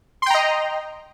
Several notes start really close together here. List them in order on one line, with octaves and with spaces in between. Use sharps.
C6 G5 A#5 D#5